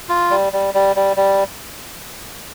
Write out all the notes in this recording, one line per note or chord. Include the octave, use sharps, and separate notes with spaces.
F4
G3
G3
G3
G3
G3